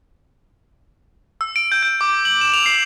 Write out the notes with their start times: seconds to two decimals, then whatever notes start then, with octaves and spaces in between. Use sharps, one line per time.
1.41 E6
1.56 D7
1.72 G6
1.83 G6
2.01 D6
2.25 F#7
2.41 E7
2.53 F7
2.66 C7